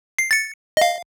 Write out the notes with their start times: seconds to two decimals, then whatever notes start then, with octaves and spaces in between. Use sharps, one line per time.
0.18 C7
0.31 A6 C#7
0.77 D#5 F5